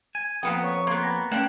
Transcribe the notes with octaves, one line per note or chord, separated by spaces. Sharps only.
G#5
F2 A#3 B3 G5 D#6
C#5 C#6
A#3 B3 C6 G#6 C7
G5 G#5 B5 A#6
A3 A#3 C#4 D4 F#5 G5